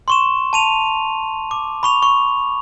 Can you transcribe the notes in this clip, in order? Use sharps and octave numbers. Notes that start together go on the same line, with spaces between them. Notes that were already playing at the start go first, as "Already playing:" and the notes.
C6 C#6 E7
A5 D#7 F7
D6
B5 C#6 F7
C#6